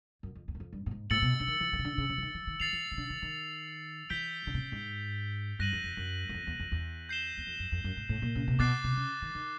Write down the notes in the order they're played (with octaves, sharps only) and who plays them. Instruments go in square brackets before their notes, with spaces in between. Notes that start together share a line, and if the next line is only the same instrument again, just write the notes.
[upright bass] F#2
F2
E2
F#2
F2
G2
A2
G#2
[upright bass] A2 [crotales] E6 A6 C#7 F#7
[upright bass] B2
D3
D#3
E3
D#3
C#3
D3
C#3
C#3
E3
D#3
E3
D#3
[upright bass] D#3 [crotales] A6 C7 F7
[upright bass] E3
D#3
D3
D#3
D#3
[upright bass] E3 [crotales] G6 B6 D7 G7
[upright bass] D3
C3
C#3
G#2
[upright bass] G2 [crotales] F#6 A#6 D#7 F#7
[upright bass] F2
F2
F#2
F#2
F2
E2
F2
E2
[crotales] G6 C7 E7 G7
[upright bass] E2
F2
F#2
F2
F#2
G#2
A2
A#2
C#3
C3
[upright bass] B2 [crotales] D6 F#6 A6 C7
[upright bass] C3
C#3
D#3
D#3